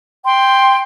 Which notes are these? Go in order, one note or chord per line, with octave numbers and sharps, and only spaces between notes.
G5 C6